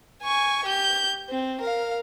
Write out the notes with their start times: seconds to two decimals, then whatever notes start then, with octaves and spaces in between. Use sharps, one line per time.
0.23 G#5 C#6
0.65 G4 G6
1.30 C4
1.61 A#4 F5